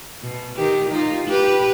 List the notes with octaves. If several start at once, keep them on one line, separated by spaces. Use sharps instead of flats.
B2
D#3 G4
D#4 F4
G4 B4